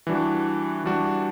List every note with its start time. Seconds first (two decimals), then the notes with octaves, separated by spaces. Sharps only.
0.07 E3 G3 D4 F#4
0.84 E3 G3 D4 F#4